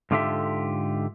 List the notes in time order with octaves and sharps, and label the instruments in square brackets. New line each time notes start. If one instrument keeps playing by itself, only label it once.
[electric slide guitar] G#2 D3 F4 G4 A4 E5